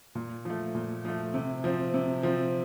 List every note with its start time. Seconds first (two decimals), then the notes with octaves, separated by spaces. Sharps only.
0.15 A#2
0.45 F3 A3
0.75 A#2
1.05 F3 A3
1.34 C3
1.64 F3 C4
1.94 C3
2.23 F3 C4